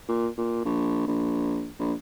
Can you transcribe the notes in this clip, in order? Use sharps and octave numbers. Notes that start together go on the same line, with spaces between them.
A#2
A#2
A#1
A#1
A#1